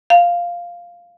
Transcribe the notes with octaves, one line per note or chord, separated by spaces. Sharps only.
F5